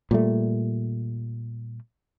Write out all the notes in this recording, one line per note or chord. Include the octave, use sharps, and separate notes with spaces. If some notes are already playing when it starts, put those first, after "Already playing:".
A#2 G3 A3